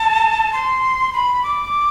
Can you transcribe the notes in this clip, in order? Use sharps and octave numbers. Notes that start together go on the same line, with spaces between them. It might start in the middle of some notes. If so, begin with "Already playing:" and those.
Already playing: A5
C6
B5
D6